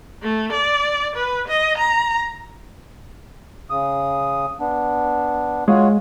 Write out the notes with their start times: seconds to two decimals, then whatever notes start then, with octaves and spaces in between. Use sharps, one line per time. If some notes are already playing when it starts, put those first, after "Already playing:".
0.22 A3
0.52 D5
1.16 B4
1.48 D#5
1.78 A#5
3.70 C#3 D#6
4.60 B3 D4
5.68 G#3 F4 F#4 C#5